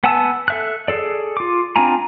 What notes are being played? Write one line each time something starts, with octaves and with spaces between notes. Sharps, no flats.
B3 F#5 G#5 A5 E6
A4 E5 F#6
G#4 A4 D5
F4 D6
C4 D4 F4 G#5 A#5